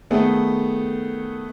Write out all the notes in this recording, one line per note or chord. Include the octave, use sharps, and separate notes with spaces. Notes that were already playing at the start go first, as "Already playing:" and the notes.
D#3 A3 B3 G#4 A4